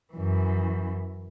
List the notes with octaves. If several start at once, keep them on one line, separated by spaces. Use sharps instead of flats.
F#2 E3